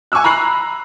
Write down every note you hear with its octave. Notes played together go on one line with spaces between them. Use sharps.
G#5 C#6 D6 E6 F#6
A#5 B5 F#6 C7 F#7